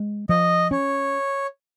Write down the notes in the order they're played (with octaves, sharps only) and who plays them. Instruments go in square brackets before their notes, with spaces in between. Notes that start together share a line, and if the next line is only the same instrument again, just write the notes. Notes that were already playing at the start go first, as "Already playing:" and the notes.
Already playing: [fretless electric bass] G#3
[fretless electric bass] F3 [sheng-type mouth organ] D#5
[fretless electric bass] C#4 [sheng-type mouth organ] C#5